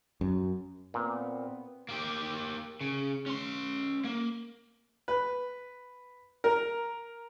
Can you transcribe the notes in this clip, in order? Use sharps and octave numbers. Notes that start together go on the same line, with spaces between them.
F#2
A#2 B3 C4
A#3 G4
C#3
C#4 C6
A#3
B4
A#4